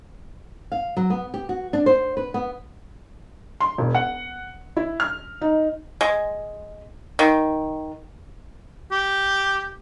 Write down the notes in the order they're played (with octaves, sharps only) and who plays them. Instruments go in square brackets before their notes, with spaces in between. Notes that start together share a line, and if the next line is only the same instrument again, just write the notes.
[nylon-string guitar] F5
F#3
B3
G4
F#4
D4
C5
B4
B3
[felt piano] C6
E1
F#5
E4
F6
D#4
[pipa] G#3
D#3
[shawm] G4